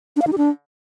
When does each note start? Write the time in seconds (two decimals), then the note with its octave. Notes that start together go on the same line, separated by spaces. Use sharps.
0.16 D4
0.22 F5
0.27 D#4
0.32 G4
0.38 D4